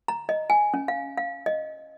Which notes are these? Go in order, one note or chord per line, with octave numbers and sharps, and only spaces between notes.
A#5
D#5
G#5
C#4
F5
F5
D#5